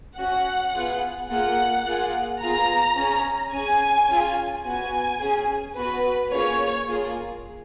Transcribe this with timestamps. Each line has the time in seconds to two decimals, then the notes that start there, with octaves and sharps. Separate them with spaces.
0.18 C#4 F#4 F#5
0.74 B3 F4 G#4
1.30 A#3 F4 G#4 F#5
1.86 A#3 F4 G#4
2.42 B3 F4 G#4 A#5
2.97 C#4 G#4
3.53 C#4 G#4 G#5
4.09 C#4 F4 G#4
4.64 B3 F#4 G#5
5.20 C#4 G#4
5.76 B3 F#4 B4
6.32 A#3 C#4 F4 G#4 C#5
6.88 A#3 F4 G#4